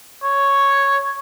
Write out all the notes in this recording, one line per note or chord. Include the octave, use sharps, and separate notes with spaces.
C#5